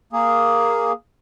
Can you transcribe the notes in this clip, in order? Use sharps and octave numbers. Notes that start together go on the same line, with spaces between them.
A#3 G#4